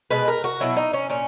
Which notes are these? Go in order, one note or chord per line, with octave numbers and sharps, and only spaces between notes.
B2 G#3 B4
A#4
F#4
B2 F#3 E4
D#4
C#4
A#2 C#4